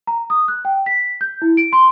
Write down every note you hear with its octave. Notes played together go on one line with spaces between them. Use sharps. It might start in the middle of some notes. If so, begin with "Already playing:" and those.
A#5
D#6
F#6
G5
B6
G6
E4
D7
C6